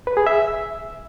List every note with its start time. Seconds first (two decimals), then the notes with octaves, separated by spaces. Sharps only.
0.07 B4
0.17 G#4
0.27 E5